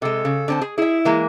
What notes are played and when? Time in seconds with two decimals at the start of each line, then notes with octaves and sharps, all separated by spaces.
0.02 C3 G#3 A4
0.25 C#3
0.48 D3 C4 A5
0.62 G#4
0.78 E4 G#4 E5
1.05 E3 G#3 A#3